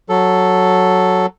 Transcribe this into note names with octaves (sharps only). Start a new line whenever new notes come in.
F#3 A4